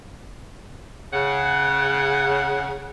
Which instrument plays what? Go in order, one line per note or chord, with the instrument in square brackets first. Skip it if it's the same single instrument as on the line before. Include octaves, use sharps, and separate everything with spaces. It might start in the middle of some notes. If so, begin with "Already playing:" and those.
[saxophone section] C#3 F#5